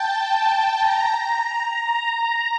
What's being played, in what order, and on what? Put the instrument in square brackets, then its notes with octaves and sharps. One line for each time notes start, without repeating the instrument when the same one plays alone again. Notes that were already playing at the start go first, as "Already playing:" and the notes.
Already playing: [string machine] G5 A5
A#5
A#5